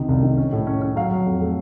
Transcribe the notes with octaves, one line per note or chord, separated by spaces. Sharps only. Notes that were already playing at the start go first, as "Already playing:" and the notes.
Already playing: C#2 C3 D#3
C2
D#3
C#4
A2
C#4
C#4
F#3 F5
F#3
F2
A3